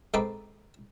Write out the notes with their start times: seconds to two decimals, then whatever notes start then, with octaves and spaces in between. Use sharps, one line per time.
0.14 G#2 C4 D#4 A4 B4 D6